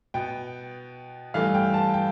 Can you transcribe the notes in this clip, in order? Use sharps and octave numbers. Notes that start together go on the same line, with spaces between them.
B2 B3 G5
G2 E3 A3 F5
G5
A5
G5